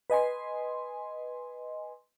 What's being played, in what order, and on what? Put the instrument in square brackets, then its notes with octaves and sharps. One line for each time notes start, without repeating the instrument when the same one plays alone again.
[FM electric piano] B4 D#5 G#5 C6